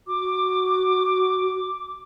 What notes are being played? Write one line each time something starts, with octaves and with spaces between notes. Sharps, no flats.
F#4 D6